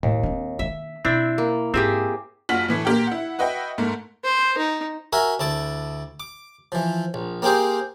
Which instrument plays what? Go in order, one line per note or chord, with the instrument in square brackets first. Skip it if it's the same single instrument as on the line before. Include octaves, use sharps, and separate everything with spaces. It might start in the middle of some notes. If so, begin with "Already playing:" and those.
[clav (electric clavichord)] D#2 [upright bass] A2
[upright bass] C4 D4
[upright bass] D#3 A#3 [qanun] E5
[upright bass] B2 [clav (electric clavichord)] C4 D4 [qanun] E4
[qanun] A#3
[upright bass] G#2 [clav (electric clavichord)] C4 [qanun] G4 G#4 E5
[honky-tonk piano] F#1 F4 F#4 B6 F#7
A2 E3 A3
A#2 G4 A#4 G5
E4 F#5
F#4 B4 D#5 E5 F#5 G5
G#2 A3 A#3
[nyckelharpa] C5
D#4
[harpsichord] F#4 A#4 E5 G#5
D2 E4 A5 D6
D6
E3 F3
A#1
A#3 C4 G4 G#4 C5